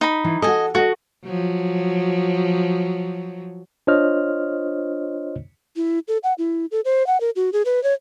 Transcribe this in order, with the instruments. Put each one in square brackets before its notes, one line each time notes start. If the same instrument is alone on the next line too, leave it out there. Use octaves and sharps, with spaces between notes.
[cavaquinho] D#4 B5
[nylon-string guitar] E3
[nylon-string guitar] F#4 A4 [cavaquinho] D#5 G#5
[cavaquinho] F#4 [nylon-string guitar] A4 D#5
[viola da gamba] F3 F#3
[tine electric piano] D4 F4 C5 C#5 D#5 F6
[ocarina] E4
A4
F#5
E4
A4
C5
F#5
A#4
F#4
G#4
B4
C#5